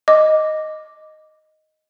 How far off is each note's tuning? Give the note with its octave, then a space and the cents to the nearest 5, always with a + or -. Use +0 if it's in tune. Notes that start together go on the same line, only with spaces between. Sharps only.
D#5 +0 D6 +0